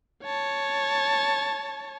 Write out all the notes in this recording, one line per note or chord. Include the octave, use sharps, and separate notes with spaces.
C#5 A5